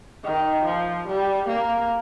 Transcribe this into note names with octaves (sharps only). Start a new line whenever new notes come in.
D#3
F3
G3
A#3